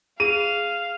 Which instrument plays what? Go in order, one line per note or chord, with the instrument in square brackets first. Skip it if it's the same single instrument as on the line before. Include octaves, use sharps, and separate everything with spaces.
[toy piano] G#4 [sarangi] F5 [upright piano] D#7